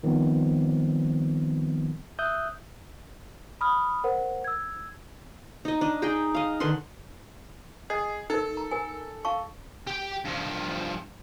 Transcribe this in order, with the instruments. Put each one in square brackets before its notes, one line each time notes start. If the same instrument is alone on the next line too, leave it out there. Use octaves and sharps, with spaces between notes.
[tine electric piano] D#3 F3 G3 B3 C4
E5 D#6 E6 F#6 G6
[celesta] B5 D#6 F6
A#4 C5 F#5
E6 G#6
[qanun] D#4 D#5
D4 D#5
D#4 G#4 D#5 G5
D#5 F5
D3 D#3 B4 C6
[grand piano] G#4 [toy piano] D#5
[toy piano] D#4 A#4 [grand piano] A4
[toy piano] A#5
A#4 G#5
F5 A5 C#6
[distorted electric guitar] G4 G5
G2 F3